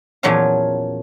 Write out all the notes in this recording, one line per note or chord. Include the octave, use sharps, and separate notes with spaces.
E2 A#2 F3 F#3 C#4 F5